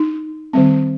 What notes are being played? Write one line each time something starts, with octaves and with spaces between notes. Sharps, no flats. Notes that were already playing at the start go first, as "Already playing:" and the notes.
Already playing: D#4
D#3 G3 C4